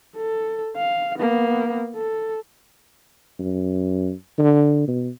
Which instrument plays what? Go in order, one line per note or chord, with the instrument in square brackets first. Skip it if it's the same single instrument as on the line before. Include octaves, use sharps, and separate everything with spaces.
[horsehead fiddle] A4
F5
A#3 B3
A4
[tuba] F#2
D3
B2